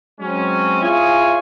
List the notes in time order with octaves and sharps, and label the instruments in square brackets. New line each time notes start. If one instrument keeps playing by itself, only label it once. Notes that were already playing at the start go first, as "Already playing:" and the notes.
[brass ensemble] F#3 G#3 C4 C#4
E4 F4 G#4 C#5 G#5